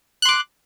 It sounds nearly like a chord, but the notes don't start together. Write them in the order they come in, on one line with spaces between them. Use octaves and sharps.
F#6 C6 D6